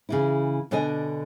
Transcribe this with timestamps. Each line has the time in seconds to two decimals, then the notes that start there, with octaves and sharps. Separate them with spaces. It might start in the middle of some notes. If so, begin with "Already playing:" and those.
0.09 C#3 E3 E4
0.71 B2 D3 D4 D#5 G#5